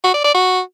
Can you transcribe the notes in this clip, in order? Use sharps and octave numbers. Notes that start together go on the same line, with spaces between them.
F#4
D5
D5
F#4